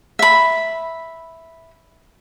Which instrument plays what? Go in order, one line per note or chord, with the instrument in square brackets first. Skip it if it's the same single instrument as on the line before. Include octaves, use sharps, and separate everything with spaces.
[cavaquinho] E5 B5